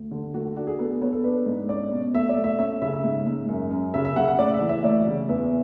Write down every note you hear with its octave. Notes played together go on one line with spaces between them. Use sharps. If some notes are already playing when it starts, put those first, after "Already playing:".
Already playing: D2
D3
A3 F#4
F#4
D4 F#4
G#4
B3 A4
A4
B3 C#5
A4
D4 B4
G#2
C#4 D5
B2
A3 E5
D5
A3
E5
C#4 E5
C#3 E5
E5
G#2
G#2
F#2
F#2
C#3 E5
E5
C#3 F#5
F#5
A2 D5
E5
E3
E5
D2 D5
C#3
E2 E5